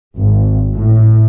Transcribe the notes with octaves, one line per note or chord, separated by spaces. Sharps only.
G#1
A2